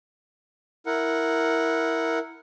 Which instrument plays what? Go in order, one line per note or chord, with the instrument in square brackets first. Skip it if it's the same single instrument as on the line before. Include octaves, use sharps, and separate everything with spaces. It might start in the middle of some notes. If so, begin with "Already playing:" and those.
[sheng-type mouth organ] E4 A#4 F#5